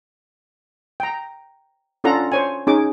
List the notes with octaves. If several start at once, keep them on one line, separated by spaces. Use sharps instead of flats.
G5 A#5
C#4 D4 F4 A4 F#5 A#5
C5 C#5 G#5
C#4 D#4 G#4 D6